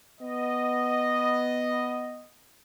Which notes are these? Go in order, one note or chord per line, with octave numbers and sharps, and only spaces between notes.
B3 D#5